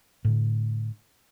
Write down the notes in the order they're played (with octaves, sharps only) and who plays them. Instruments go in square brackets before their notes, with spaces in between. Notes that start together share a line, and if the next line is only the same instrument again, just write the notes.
[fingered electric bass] A2 D3